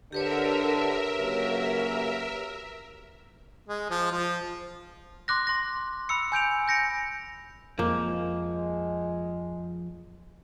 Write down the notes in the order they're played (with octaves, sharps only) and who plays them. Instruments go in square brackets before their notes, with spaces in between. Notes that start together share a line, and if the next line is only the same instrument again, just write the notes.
[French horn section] D3 [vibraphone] G4 B4 C#5 [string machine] A#4 E5
[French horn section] C#3 F#3 A#3
[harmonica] G#3
F3
F3
[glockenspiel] C6 D6 F#6 A#6
C6 A#6
B5 E6 C#7
G#5 G6 D7 F7
G6 A#6 C#7 D7
[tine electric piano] F2 [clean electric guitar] F3 [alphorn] G#3 [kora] A#3